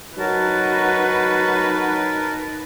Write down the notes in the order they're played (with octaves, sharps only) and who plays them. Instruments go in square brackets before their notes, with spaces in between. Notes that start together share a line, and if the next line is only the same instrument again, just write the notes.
[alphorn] F#3 [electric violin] D#4 B4 [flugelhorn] F#4 [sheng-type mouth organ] A#4 A5